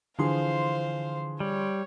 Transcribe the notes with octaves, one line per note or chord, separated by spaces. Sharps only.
D3 E3 F3 G#4 C5 F5 C6
G3 C#5